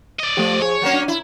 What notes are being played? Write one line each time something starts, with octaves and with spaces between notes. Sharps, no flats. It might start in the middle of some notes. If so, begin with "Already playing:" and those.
D5 D#5
F3 A3 G4
G#4 C#5
F#3 A#3 C#4
D4
E4